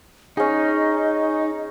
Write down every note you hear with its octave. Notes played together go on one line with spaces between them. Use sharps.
C#4 D#4 G#4 D#5